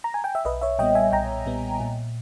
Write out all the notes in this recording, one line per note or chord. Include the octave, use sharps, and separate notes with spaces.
A#5
G#5
G5
E5
B1 B4 D#5
C#5 E5
A#2 G3 B3 D#5 G5
E5 G#5
B1 G5 A#5
A#2 G3 B3
A#2